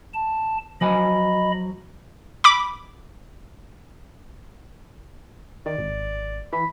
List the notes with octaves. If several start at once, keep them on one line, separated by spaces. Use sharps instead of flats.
A5
F3 F#3 D#5 G#5 B5
B5 D6
D#3 D5
G#1
E3 B5